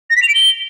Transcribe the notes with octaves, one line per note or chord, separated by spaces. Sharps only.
A#6
B6
F7
D7
G7